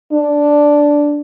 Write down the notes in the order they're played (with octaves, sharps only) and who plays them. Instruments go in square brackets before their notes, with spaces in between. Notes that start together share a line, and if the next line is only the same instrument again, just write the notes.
[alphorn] D4